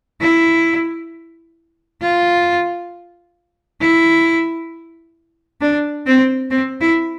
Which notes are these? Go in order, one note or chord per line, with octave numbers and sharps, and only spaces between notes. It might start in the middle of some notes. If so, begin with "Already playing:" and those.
E4
F4
E4
D4
C4
C4
E4